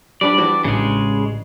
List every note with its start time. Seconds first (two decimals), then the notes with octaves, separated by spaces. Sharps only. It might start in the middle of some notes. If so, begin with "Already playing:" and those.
0.21 G3 D4 B4 D5
0.38 E3 D4 F#4
0.64 A1 C#3 G#3